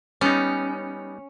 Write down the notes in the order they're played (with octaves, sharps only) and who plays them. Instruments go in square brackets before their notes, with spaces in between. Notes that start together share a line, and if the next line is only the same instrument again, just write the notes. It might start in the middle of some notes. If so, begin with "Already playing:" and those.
[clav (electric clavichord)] G3 B3 D#4 [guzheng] C#4